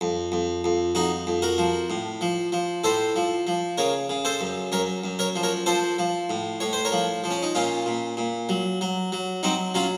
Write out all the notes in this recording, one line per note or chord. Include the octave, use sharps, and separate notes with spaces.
F2
F2
F2
F2 D#4 F#4
F2
F#4 A#4
F3
A2
F3
F3
A2 A4 C5
F3
F3
C#3 A#4 C#5
C#3
A4 C5
F#2
F#2 A#4 C#5
F#2
A#4 C#5
F3
A#4 C#5
F3 A4 C5
F3
A2
A2 C#5
C5
A#4 C#5
F3
F3
C#4
D#4
A#2 C#4 F4
A#2
A#2
F#3
F#3
F#3
F#3 C4 D#4
F#3 C#4 F4